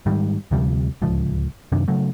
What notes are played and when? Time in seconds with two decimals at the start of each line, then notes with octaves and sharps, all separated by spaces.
0.06 G#2 D#3 G3
0.51 D2 C3 F3 G3
1.02 D1 C#2 F3
1.72 F#2 C3 D#3 D4
1.88 C#3 F#3 A3